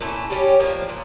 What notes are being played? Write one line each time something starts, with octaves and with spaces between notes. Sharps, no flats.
A#2 A3 C#4 E4
G3 C#4 G4 C#5
F3 A#3 D4 F4
A#2